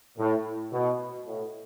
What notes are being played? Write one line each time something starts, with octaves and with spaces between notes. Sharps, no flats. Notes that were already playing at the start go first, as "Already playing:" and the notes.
A2
B2
A2